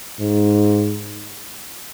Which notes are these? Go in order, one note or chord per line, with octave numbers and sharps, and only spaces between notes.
G#2